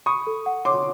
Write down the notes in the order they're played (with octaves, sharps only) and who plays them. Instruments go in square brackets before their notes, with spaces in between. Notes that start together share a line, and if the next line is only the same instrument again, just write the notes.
[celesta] B5 [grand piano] C#6 D#6
[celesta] A4
F#5
[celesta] C#5 [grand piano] C6 D6